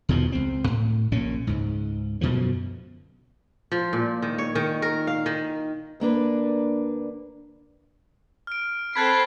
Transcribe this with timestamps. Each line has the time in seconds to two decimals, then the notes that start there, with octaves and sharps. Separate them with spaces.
0.09 E2 B2 D#3 F3
0.32 C#2 C4
0.68 A2
1.12 A#1 A#2 C#3 C#4
1.47 C#2 G#2
2.21 F#2 B2 D3 F3
3.72 F3
3.93 A#2
4.22 D#3
4.38 C#5
4.55 D#3
4.82 A#4
5.07 F5
5.26 D#3
6.00 D2 A#3 D4 B4
8.47 F6 D7
8.95 C4 A4 B5 F#6 G#6 B6 C7